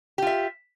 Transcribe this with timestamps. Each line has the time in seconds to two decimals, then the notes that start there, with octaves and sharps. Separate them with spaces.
0.18 G4
0.22 F4
0.27 E5